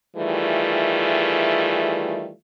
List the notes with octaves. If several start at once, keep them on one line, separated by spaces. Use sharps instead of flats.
D#3 E3 G3 A3 F4 G#4